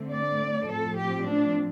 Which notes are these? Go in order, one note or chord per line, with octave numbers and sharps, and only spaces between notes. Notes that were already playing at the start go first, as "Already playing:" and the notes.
Already playing: D3 A3 C4
D5
A2 F3 C4 A4
G4
D4